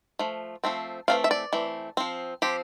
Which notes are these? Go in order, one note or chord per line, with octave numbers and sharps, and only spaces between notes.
F3 A3
F3 A3 C4
E3 A3 C4 F5
E5
D5
E3 A3 C4
F3 C4
F3 C4 G4